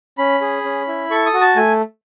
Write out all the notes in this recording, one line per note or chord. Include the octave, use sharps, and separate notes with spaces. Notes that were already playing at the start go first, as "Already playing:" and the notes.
C#4 B5
G#4
C#4
E4
A4 C#6
D#6
F#4
A5
A3 G#5